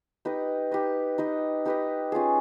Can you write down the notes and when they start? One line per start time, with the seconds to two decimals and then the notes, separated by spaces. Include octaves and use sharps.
0.25 D#4 G4 B4 D#5
0.71 D#4 G4 B4 D#5
1.18 D#4 G4 B4 D#5
1.65 D#4 G4 B4 D#5
2.12 C#4 F4 G#4